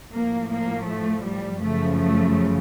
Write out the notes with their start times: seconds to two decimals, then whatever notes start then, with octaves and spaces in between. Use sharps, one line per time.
0.13 A2 F3 A#3
0.50 A#3
0.87 A3
1.25 G3
1.62 F#2 C#3 F3 A3
1.98 A3